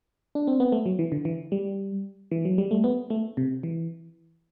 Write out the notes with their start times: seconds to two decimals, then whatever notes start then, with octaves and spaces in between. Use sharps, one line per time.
0.35 D4
0.47 C4
0.60 B3
0.72 A3
0.86 F#3
0.99 E3
1.12 D3
1.25 E3
1.52 G3
2.31 E3
2.45 F#3
2.58 G3
2.71 A3
2.84 B3
3.10 A3
3.37 C3
3.63 E3